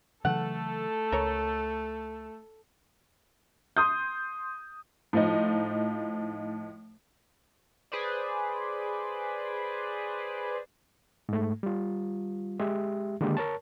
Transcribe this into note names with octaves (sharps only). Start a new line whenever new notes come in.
C#3 E3 F#3 A3 A4 F#5
C#2 A#4 C#5
C6 D#6 G6
A2 F3 D#4
G#4 B4 C5 D5
G#2 A3
G3 F4
G#3 G4 E5
D3 D#3 G#3 A#3 D#4 G4
A#4 C#5 A5